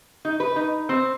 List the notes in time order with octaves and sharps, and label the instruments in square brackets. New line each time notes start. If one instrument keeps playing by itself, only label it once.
[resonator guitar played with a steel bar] D#4
B4
D#4
C4